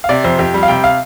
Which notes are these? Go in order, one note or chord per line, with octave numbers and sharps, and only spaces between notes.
F5
C3 D5
F2 C5
F2 G4
G3
F5
C3 G5
F5